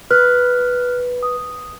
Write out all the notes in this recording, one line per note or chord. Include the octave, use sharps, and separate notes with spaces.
B4 F6 F#6
D#6